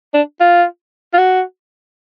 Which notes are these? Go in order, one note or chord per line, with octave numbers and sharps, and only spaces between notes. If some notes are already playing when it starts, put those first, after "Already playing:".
D4
F4
F4
F#4